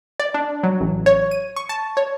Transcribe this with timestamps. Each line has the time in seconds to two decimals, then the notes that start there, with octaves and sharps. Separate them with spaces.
0.20 D5
0.34 D4
0.63 F#3
0.80 A1
1.06 C#5
1.31 D#7
1.56 C#6
1.69 A5
1.97 C#5